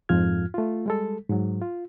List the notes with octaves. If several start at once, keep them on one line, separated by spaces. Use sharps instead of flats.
F2 G#2 F3 F4 F6 G#6
A3 F4
G3 G#3 A4
G#2 F#3
F4